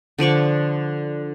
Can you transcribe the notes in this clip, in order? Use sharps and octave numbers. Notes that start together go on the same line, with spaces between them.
D3 F3 D5 C#6